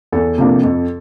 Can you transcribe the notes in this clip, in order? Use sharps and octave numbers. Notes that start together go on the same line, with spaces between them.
E2 A4
C3 F3 A#3 D4
F2